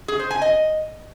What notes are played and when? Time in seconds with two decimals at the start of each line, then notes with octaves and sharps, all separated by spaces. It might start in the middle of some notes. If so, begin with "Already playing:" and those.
0.08 G#4
0.19 C5
0.31 G#5
0.42 D#5